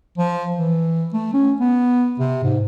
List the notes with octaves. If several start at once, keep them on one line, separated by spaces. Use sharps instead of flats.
F3
E3
A3
C#4
B3
C3
G#2